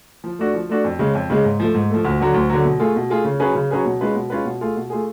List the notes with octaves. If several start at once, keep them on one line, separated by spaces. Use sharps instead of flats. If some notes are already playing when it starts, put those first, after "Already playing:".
F3
A3 D4 F#4
F3
A3 D4 F#4
F2
C#3 G#3
F2
C#3 G#3
G#2
F3 A3
G#2
F3 A3
D2
D3 F#3
D2
D3 F#3
B2
A3 F4 G#4
B2
A3 F4 G#4
C#3
F#3 C#4 G#4 B4
C#3
F#3 C#4 G#4 B4
B2
G#3 C#4 F4 B4
B2
G#3 C#4 F4 B4
B2
A3 F4 G#4
B2
A3 F4 G#4